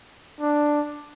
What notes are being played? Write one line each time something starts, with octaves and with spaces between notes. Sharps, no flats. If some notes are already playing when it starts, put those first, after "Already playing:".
D4